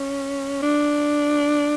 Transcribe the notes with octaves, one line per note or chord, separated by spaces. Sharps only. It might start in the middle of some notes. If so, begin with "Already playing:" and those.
Already playing: C#4
D4